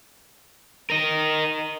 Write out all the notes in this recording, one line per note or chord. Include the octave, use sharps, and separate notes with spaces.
A#4 D#5